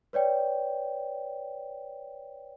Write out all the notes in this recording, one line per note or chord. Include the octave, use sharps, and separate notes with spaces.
B4 C#5 D5 G5